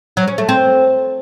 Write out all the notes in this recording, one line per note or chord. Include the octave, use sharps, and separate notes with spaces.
F#3
C#4
A3
C4